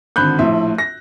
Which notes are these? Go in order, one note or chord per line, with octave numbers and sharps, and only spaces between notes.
G#1 D3 C4 B5 F#6 G6
A#1 A2 E5 C6
A#6